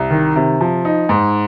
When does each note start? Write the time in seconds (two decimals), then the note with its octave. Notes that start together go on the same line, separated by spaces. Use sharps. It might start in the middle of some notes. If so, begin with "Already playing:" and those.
Already playing: C2
0.10 D#3
0.36 C3
0.61 F3
0.85 D#4
1.09 G#2